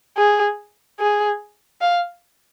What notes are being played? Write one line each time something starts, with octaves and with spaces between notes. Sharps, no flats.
G#4
G#4
F5